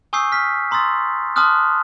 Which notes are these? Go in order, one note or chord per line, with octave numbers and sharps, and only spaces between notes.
G#5 C#6 D#6 E6 G6 C7
F6 B6
A#5 C6 D#6 E6 A6
A5 C6 D6 D#6 F6 F#6